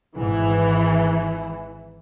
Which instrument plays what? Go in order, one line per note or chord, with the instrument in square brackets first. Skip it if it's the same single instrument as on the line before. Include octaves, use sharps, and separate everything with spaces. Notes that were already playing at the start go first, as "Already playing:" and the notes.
[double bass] G#1 G#2 [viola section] E3